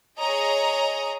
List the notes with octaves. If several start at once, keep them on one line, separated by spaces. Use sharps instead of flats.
G#4 C#5 D#5 A#5